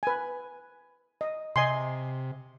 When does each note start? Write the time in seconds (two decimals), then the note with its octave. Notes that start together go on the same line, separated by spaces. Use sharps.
0.03 B4 G#5
1.21 D#5
1.56 C3 D#5 G#5 C6